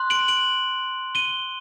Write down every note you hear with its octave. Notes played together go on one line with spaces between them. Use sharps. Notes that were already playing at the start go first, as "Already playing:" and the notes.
Already playing: C6 F#6
D7 F#7
D7 F#7
D#7 G7